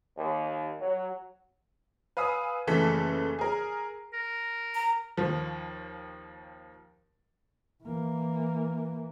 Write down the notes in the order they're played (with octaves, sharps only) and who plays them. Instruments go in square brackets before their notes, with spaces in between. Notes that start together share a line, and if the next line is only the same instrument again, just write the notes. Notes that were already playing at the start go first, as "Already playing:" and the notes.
[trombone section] D#2
F#3
[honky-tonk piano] B4 F5 G#5 D#6 E6
F#1 C#3 E3 A3 A5 B6
G#4 A#4
[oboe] A#4
[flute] A#5
[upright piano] D#2 F3
[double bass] E3 A#3